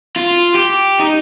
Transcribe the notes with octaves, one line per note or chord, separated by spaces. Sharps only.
F4
G4
D#4